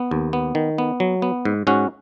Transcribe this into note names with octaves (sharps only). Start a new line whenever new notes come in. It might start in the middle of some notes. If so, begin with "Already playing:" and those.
Already playing: B3
D#2
B3
D#3
B3
F#3
B3
G#2
G#2 C#4 F#4